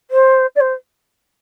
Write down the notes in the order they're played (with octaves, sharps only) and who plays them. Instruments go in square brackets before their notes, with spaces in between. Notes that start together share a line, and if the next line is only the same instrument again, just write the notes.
[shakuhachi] C5
D5
C5